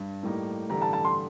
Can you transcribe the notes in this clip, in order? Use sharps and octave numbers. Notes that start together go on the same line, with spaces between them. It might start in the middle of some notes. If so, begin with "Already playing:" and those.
Already playing: G2
A2 G3 A#3 D#4
A1 G2 D3 G3 A#5
A5
A5
C6